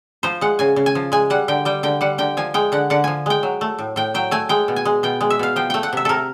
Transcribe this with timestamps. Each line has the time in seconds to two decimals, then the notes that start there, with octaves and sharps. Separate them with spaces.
0.23 F3 C5
0.41 G#3 F#5
0.59 C#3 G#5
0.76 C#3
0.86 G#5
0.95 F3
1.12 G#3 G#5
1.30 G3 F#5
1.48 D3 G5
1.65 G3 G5
1.83 D3 G5
2.01 G3 F#5
2.18 D3 G5
2.37 F3 G#5
2.54 G#3 G5
2.72 D3 F#5
2.90 D3 F#5
3.04 F3 G#5
3.26 G#3 G5
3.43 F#3
3.61 A3
3.79 A2
3.96 A2 G5
4.14 F#3 G5
4.31 A3 G#5
4.49 G#3 G5
4.68 B2
4.76 G#5
4.85 G#3
5.03 B2 G5
5.21 G#3
5.30 E5
5.39 B2 F5
5.56 F3 G5
5.70 A3 G5
5.83 F#5
5.93 C3 E5
6.05 C3 A4 A#4